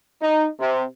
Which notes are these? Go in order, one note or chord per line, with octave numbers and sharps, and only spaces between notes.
D#4
C3